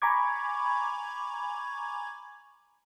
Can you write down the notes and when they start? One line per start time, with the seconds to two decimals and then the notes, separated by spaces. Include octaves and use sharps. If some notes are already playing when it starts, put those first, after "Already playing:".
0.02 G#5 A#5 B5 C#6 D6 G#6